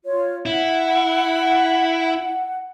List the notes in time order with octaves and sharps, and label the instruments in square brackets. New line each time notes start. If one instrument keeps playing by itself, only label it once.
[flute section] F4 C#5
[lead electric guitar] E4 [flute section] F#5